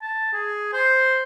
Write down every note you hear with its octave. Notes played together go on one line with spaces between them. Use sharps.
A5
G#4
C5